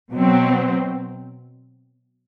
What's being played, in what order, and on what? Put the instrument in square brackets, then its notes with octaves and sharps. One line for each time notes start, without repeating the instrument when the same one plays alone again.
[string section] B2 F#3 C4